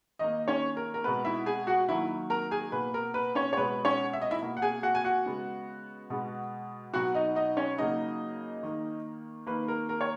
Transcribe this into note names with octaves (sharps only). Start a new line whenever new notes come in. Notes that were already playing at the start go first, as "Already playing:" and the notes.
D#3 A#3 D#4 D#5
C#4 C#5
A#4
A#4
B2 G#3 B3 B4
E4 E5
G#4 G#5
F#4 F#5
D#3 F#3 A#3 E4 E5
A#4 A#5
G#4 G#5
B2 A#3 B4
A#4
B4
C#4 C#5
C#5
B2 G#3 B3 B4
C#4 C#5
E5
D#5
E4 E5
B2 A#3
F#5
G#4 G#5
F#4 F#5
G#5
F#4 F#5
C#3 G#3 B3
B2 G#3 B3
B2 F#3 B3 F#4 F#5
D#4 D#5
D#4 D#5
C#4 C#5
C#3 F#3 A#3 D#4 D#5
D#3 A#3
D#3 A#3 B4
A#4
A#4
C#5